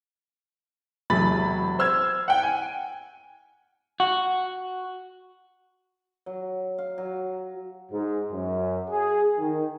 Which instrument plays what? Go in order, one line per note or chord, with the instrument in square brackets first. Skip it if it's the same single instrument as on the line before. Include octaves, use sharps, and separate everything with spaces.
[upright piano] E1 C3 F#3 B5 A6
C5 E6 F6 G#6
F#5 G5
G#5
[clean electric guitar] F#4
[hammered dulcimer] F#3
F5
F#3
[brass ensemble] G#2
F#2
G#4
D#3